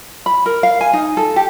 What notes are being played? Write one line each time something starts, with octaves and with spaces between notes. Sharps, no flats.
B5
A#4
F5
G#5
D#4
A4
G4